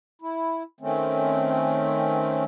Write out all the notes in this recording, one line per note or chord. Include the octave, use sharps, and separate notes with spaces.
E4
D#3 A3 C4 C#4